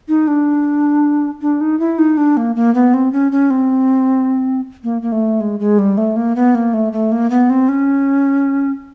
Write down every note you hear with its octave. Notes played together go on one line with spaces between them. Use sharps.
D#4
D4
D4
D#4
E4
D#4
D4
A#3
A#3
B3
C4
C#4
C#4
C4
A#3
A#3
A3
G#3
G#3
G3
A3
A#3
B3
A#3
A3
A3
A#3
B3
C4
C#4